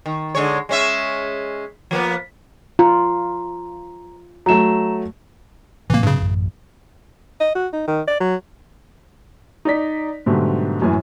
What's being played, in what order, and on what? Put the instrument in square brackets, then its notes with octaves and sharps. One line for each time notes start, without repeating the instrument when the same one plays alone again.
[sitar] D#3
D3 G#3 C#5
G#3 C#4 E5
F3 A#3 B3
[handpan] F4 [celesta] A#5
[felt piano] F#3 A3 [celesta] A#5 E7
[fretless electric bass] A2 C3 F#3 [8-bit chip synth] E3 A#3
[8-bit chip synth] G2 C#3
[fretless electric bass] A1 F#2
[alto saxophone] D#5
F#4
D#4
D#3
D5
F#3
[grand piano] D#4 D5 B6
G#2 B2 D3 F#3 G3 A3
F#2 A2 E3 G#5